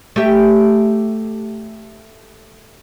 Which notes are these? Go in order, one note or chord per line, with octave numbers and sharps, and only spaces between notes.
A3 G4 E5